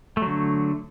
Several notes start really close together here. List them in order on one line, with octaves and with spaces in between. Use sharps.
A3 F#3 D3